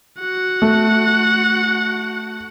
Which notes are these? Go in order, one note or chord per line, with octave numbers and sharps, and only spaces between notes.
F#4 F#5
A3